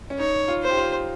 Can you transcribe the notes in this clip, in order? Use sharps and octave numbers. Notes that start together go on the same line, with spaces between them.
C#4
D#4 C#5
F4
C5
G4
F4